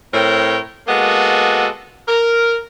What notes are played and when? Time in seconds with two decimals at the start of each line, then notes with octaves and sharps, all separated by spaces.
0.14 A2 C4 A#4 C#5 G5
0.88 G#3 A#3 B3 F#4 A4
2.08 A#4